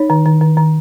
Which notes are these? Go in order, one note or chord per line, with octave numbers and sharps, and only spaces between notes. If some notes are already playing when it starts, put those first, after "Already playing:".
Already playing: D#4 C#5
D#3
D#3
D#3
D#3